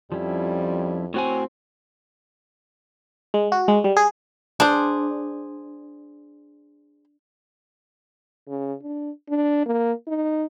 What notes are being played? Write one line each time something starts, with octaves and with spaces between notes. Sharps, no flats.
F2 F3 G3 C#4 E4
A2 C4 F#4 C#5 G#5
G#3
F#4
G#3
G3
G#4
D4 G#4 C5
C#3
D4
D4
A#3
D#4